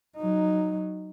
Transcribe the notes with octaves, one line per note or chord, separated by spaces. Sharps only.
F#3 D#4